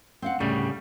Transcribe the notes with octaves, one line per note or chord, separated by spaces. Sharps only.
C4 F5 F#5
D2 A2 C#3 G3